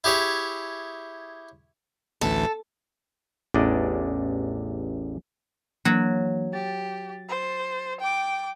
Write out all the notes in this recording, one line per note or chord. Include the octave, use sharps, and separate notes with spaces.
E4 G4 G#4 C#5 E5
A1 D2 E3 A4
A1 E2 D4 D5 D#5
E3 F#3 A#3 D4
G4 A6
C5
G5 D6